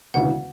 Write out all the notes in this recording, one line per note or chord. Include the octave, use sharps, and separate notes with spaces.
E1 D2 C#3 E3 F#5